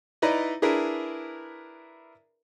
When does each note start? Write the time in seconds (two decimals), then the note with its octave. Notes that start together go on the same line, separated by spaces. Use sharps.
0.22 D#4 E4 B4 D5 D#5 A#5
0.62 D4 E4 G#4 A#4 B4